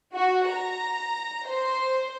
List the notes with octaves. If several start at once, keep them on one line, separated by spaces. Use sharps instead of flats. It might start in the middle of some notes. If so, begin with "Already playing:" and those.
F#4
A#5
C5